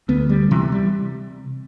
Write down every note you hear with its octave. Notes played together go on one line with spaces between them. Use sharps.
D2 B3
G3
C3 E3
G3